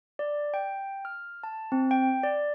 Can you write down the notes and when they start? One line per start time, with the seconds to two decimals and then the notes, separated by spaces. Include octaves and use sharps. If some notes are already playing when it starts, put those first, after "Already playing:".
0.19 D5
0.54 G5
1.05 F6
1.43 A5
1.72 C4
1.91 G5
2.23 D5